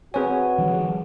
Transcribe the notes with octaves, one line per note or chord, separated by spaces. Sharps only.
C4 F#4 G#4 B4 C#5 G#5
D#3 F3 G3